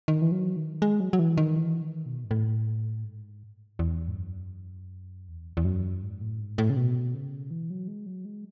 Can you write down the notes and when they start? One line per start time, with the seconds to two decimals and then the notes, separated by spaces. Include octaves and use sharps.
0.08 D#3
0.22 E3
0.32 F#3
0.56 D#3
0.82 G#3
1.00 F#3
1.13 F#3
1.19 E3
1.37 D#3
1.56 E3
1.81 D#3
2.06 B2
2.24 G#2
2.31 A2
3.04 G#2
3.79 E2
4.08 G#2
4.16 F#2
5.29 E2
5.57 E2
5.65 F#2
6.03 G#2
6.21 A2
6.40 G#2
6.58 A2
6.70 C#3
6.77 B2
7.14 C#3
7.51 E3
7.70 F#3
7.88 G#3
8.06 F#3
8.25 G#3